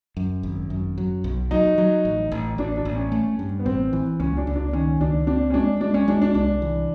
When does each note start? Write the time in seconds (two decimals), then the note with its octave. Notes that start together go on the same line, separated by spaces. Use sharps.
0.17 F#2
0.43 G#1
0.70 F#2
0.98 F#3
1.24 B1
1.51 F#3 D#4
1.78 F#3
2.05 A1
2.32 A1
2.58 A1 D4
2.77 D4
2.85 A1
2.95 C#4
3.12 A3
3.39 G2
3.59 B3
3.65 A1 C4
3.93 E3
4.20 C#2 C#4
4.37 D4
4.47 C#2
4.56 D4
4.73 D#3 C#4
5.01 C#2 D4
5.27 C4 D4
5.50 C#4
5.54 G#3 D4
5.81 G#3 D4
5.94 C#4
6.08 G#3 D4
6.22 D4
6.34 C2 D4
6.62 E3